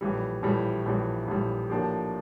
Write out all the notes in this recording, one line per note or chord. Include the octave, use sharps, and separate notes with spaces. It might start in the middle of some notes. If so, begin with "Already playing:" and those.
A#1 A2 E3 G3
A#1 A2 E3 G3
A#1 A2 E3 G3
A#1 A2 E3 G3
A2 F3 A#3 D4 G4